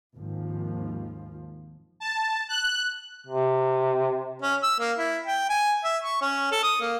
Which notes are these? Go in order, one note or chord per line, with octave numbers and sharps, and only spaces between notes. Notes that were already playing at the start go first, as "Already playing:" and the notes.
G#1 D#2 F3
A5
F#6
C3
C#4
E6
A#3
E4
G5
G#5
E5
C#6
C#4
A4
D#6
A#3